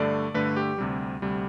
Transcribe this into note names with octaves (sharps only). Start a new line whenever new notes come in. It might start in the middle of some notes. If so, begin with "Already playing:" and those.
Already playing: G2 D3 A3 D5
G2 D3 A3 B4
G4
D2 C3 G3
D2 C3 G3